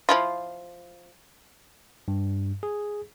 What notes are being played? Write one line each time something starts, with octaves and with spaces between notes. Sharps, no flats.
F3 E4 F4
G2
G#4